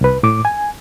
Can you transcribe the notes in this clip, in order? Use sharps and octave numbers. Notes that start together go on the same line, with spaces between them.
C2 B4
A2 D6
G#5